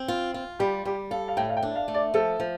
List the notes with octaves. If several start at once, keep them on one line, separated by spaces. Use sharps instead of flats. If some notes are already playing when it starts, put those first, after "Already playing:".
Already playing: C4
F4
F4
G3 G4
G3 G4
A4 F5
F5
A2 G5
F5
G5
D4
F5
A3
D5
F3 A4
F3